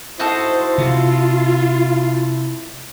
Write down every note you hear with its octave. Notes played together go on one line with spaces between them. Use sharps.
D#4 E4 F#4 A4 C5
C3 F4